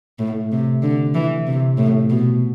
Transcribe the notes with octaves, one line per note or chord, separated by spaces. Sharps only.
A2
C3
D3
E3
C3
A2
B2